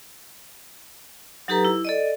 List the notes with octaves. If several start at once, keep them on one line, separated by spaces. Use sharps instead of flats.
F#3 D#4 G4 A4 B4 A#5
E4
A4 D5 D#5